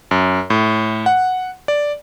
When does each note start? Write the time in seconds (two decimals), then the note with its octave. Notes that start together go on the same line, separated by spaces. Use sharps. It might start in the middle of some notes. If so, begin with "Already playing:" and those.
0.11 F#2
0.50 A2
1.06 F#5
1.68 D5